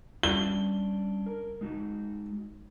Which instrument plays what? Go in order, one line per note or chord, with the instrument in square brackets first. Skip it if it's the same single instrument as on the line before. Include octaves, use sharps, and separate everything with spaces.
[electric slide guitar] G3 C#4 D4 [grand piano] G7
[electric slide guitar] A#4
G#3 D#4 F#4